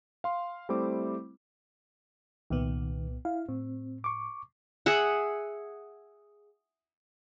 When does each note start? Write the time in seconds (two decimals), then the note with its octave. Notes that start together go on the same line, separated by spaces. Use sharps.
0.24 F5 C6
0.69 G3 A3 C4 E4 C5 D6
2.50 C2 A#2 D#3 B3
3.25 E4 F5
3.49 A2 C4
4.04 C#6 D6
4.86 G#4 E5 F#5